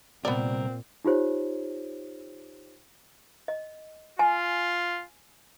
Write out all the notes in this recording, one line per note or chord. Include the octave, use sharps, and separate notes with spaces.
C2 A#2 B3 C4 A#4 D5
D#4 F4 G4 C5 C#5
D#5
F4 G#5